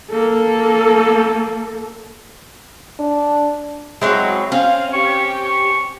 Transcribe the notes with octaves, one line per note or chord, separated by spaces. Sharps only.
A#3 A4
D4
F#3 G#3 C4 E4 F#4
C4 C#4 F5
G4 C#6
C#6